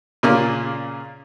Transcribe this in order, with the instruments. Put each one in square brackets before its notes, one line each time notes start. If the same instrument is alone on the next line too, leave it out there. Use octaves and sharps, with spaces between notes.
[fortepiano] A#2 C#3 A#3 C#4 D5 F6